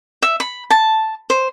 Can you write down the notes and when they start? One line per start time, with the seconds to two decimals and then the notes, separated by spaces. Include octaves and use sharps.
0.22 E5
0.40 B5
0.70 A5
1.30 C5